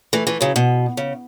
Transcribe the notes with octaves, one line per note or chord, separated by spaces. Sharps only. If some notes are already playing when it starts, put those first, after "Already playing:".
E3 A3
E3 A3
C#3 F#3
B2
C#3